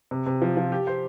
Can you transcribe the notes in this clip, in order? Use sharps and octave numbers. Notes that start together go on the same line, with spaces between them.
C3
C3
F3
F3
G4
C5